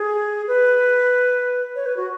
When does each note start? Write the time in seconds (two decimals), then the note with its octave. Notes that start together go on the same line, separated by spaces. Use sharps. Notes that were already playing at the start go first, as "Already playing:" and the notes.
Already playing: G#4
0.47 B4
1.75 C#5
1.86 B4
1.97 F#4